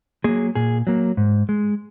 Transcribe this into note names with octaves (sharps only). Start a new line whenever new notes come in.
F#3 A#3 G#4
A#2 G#4
F#3 A#3
G#2
G#3